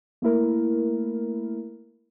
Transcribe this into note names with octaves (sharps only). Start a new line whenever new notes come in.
A3 A#3 E4 A#4